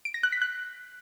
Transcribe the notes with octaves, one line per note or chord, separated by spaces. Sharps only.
D7
A#6
F#6
B6
F#6